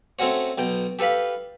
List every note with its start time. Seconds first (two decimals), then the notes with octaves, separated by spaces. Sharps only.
0.19 A3 C4 C#4 F#4 C#5
0.58 B1 B2 G5
0.99 G4 A4 B4 F5 B5